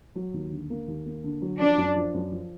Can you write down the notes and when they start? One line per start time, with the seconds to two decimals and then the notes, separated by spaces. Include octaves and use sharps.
0.15 F#3
0.34 D#2
0.52 D3
0.70 A#3
0.88 D#2
1.06 A#3
1.24 D3
1.42 F#3
1.60 F3 D4
1.78 F#2
1.96 F3
2.14 F#2
2.32 F3